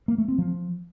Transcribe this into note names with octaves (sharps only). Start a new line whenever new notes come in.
A#3
A3
C4
F3